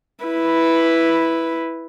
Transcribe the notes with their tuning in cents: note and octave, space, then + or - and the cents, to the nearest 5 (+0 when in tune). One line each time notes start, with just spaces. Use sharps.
E4 +0 B4 +0